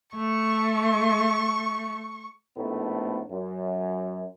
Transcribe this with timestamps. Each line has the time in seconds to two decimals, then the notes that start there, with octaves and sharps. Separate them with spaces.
0.16 A3 C#6
2.56 A#1 A2 A3 B3 D#4
3.30 F#2